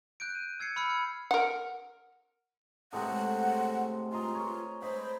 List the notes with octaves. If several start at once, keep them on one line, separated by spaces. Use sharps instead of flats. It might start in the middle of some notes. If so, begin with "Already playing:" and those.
F#6 G6 D7
D#7
E6 G#6 C7 C#7
B5 E6 F6 C#7
F6 G#6
A#4 F#5
A2 C3 G#3 F#5
F4 D#5 A#5 C6
C#5
C5 D#5 B5